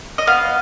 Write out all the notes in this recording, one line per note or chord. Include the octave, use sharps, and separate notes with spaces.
D#5
B3 F5